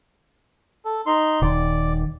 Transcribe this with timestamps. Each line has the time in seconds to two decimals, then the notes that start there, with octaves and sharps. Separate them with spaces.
0.85 A4
1.06 D#4 C6
1.42 D#1 D#3 D5